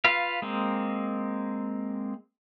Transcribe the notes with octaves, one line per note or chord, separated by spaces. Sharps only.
F4 B4 F5
G#3 A#3 C4